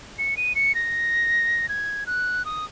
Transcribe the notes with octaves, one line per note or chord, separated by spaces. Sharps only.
C#7
D#7
C#7
A#6
G#6
F#6
D#6